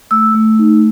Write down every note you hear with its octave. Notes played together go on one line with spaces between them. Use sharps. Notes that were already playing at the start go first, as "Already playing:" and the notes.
A3 E6
A3
D#4